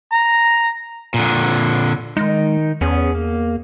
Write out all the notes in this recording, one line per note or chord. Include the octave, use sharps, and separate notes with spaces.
A#5
A#2 D3
D#3 G#3 D#4
E2 B3 C#4 G#4
A#3